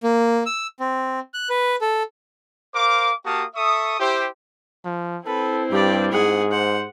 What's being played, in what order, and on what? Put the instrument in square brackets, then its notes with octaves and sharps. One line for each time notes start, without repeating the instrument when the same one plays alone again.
[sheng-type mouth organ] A#3
E6
C4
F#6
B4
A4
[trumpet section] A#4 C5 F5 D6
A#3 F#4 G4 F5 A5 D#6
A4 E5 C#6 D#6
E4 G4 C5
[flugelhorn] F3
[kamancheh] C4 E4 [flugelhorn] A4 [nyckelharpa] B4
[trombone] G2 [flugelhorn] G3 [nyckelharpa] G4 D5
[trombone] G#2 [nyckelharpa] G#4 F#5
[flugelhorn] C5 [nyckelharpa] F#5